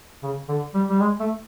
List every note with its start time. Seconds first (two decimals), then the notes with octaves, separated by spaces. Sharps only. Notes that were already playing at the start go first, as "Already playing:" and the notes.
0.23 C#3
0.49 D3
0.74 G3
0.89 G3
1.01 G#3
1.20 A3